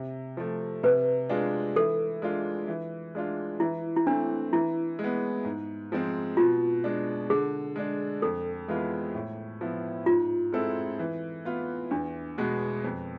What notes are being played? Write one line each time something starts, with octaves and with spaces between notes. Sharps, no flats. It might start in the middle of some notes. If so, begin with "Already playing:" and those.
Already playing: C3
F3 A3
C3 B4
G#3 D4 F4 G#4
E3 A4
G#3 D4 F4
E3
G#3 D4 F4
E3 E4
E4
A3 C4 D4
E3 E4
G#3
B3
G#2
F3 G#3 C4
B2 F4
G#3 D4
D3 G#4
G#3 D4
F2 A4
E3 G#3 B3 F4
A2
F3 B3 E4
G#2 F4
G#3 C4 E4 A4
E3
B3 F4
E2 D4
B2 G#3 B3
F2